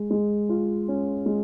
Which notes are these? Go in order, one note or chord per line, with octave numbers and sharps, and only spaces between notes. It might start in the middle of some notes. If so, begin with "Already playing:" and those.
Already playing: G#3
G#3
F4
C#4
G#3